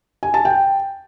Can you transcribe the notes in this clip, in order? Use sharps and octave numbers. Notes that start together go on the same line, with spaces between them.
G#5
A5
G5